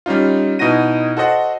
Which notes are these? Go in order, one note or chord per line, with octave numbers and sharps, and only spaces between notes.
G3 C#4 D#4 F4
B2 D#4 E4 F#4 A#6 D#7
F#4 A4 C5 D#5 F#5